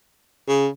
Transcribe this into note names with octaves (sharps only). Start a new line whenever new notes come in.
C#3